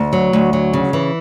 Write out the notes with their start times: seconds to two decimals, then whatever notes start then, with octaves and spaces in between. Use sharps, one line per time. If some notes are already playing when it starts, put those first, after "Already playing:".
Already playing: D2
0.13 F#3
0.33 D2
0.53 F#3
0.73 C#3
0.93 E3